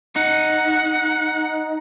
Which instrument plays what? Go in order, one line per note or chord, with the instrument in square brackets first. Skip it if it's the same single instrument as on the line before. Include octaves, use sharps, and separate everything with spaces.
[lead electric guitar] D#4 [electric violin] F#5